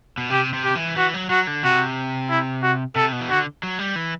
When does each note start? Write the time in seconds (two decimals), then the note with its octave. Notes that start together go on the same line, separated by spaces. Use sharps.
0.18 B2
0.30 C3 G4
0.53 C3
0.64 G4
0.75 E3
0.96 E3 F#4
1.14 F#3
1.30 F#3 F#4
1.47 D3
1.63 C3 F#4
2.29 E4
2.63 F#4
2.96 C3 A4
3.12 B2
3.21 E3
3.30 D3 F#4
3.63 F#3
3.79 G3
3.96 E3